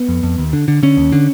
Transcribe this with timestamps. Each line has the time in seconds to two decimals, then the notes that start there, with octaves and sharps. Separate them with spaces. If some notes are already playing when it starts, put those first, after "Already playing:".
Already playing: B3
0.09 F2
0.23 F2
0.38 D#2
0.53 D3
0.68 D3
0.83 D3 C#4
0.97 D#2
1.12 D3